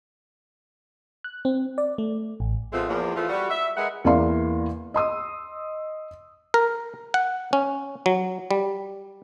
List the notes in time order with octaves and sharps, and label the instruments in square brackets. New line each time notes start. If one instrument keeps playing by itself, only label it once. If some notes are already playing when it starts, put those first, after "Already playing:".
[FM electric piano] F#6
C4
D5
A3
A1
[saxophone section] F3 G#3 A3 B3 C4 F4
E2 F3 A#3
E3 F3 A3 F4
G3 F#4
E5
G#3 A#4 B4 D#5 E5 F#5
[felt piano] E2 E3 A#3 D5 F5 C6
D#5 C6 D#6 E6
[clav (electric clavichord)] A#4
F#5
C#4
F#3
G3